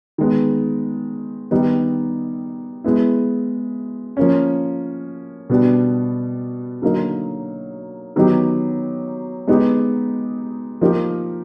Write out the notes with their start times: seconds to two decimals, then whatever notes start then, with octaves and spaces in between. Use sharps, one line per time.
0.18 D#3 G#3 B3
1.51 D#3 G3 B3 D#4
2.84 G#3 B3 E4
4.17 F3 A#3 C#4
5.50 B2 G3 B3 D4
6.82 D3 F#3 A#3 D#4
8.16 D#3 F#3 B3 D#4 G4
9.47 G#3 B3 D#4 G4
10.81 F3 A#3 D#4 G4 A#4